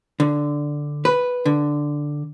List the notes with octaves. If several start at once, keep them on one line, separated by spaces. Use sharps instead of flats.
D3
B4
D3